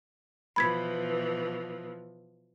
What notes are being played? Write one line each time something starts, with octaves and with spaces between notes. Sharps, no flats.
B2 E3 F3 B5 G#6 B6